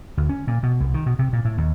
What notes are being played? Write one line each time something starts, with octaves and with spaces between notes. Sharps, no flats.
D2
C#4
A#2
B2
C2
D#3
B2
C3
A#2
A2
D#2